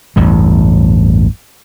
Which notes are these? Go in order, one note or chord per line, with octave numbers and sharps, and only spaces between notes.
A1 E2 G2